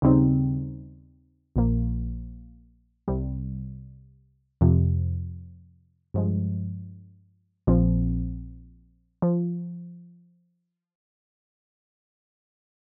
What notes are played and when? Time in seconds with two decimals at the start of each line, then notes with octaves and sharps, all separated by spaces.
0.02 D#2 C#3 G3 C4 D#4
1.56 A#1 A#2 F3 A#3
3.08 C2 C3 G3
4.61 F2 C3 F3
6.14 G2 F3 G#3
7.67 A#1 A#2 F3 C4
9.22 F3